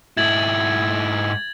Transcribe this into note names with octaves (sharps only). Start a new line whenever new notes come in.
G#2 E4 G#6 A6 F#7